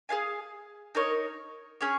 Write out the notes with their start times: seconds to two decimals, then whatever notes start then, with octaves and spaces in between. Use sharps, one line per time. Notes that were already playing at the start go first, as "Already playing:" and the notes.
0.09 G#4 C#5 F5 G#5
0.95 D#4 A#4 C#5
1.81 C#4 G#4 C#5